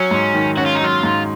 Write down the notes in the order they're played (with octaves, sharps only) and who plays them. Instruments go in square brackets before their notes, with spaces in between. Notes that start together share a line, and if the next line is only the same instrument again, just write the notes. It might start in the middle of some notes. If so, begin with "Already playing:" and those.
Already playing: [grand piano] F#3 [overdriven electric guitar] C#4
[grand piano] G#2
D#3
[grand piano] C#4 [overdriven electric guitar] F#4
[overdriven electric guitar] F4
D#4
[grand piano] F#3 [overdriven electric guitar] F4
[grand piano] G#2